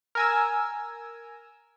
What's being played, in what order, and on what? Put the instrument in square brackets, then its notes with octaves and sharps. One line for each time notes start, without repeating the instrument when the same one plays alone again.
[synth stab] A#4 G#5 E6